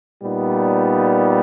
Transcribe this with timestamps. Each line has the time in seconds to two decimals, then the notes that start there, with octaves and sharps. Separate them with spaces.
0.21 A#2 G3 B3 D#4